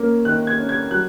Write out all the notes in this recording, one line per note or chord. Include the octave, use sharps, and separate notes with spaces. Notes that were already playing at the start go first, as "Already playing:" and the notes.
Already playing: A#3 C#4
D#3 F#6
G#6
C#4
G#6
F#3 F#6